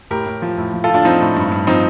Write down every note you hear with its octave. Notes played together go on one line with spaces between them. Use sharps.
A2 G4 A#4
A2
F3
A2
F3
F4 A4
F3
D4 F4
F3 C4 D#4
A2
G2
G2
F3 C4 D#4